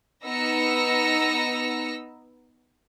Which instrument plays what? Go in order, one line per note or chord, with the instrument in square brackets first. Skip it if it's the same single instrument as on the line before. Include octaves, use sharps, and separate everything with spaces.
[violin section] B3 D#4 E6 A#6 C#7